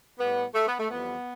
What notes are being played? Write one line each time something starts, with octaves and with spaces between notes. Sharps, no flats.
A2 G3 B3
A3
B3
A3
F2 E3 G3 B3